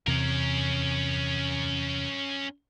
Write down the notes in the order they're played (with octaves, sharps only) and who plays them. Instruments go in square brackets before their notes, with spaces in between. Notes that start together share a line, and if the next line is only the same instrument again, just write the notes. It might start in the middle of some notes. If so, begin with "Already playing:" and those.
[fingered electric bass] E2 C3 [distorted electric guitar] C#4 A#4